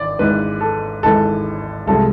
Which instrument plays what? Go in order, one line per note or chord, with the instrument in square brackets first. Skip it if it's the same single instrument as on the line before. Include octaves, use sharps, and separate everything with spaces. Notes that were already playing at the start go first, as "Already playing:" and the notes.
Already playing: [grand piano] G#1 E3 D5
G#1 G#2 E3 B4
A4
G#1 G#2 E3 A4
C2 C3 F3 G#3 A4